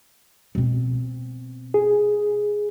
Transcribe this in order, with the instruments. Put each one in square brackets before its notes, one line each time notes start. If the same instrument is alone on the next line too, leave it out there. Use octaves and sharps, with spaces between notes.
[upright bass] B2 C4
[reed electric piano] G#4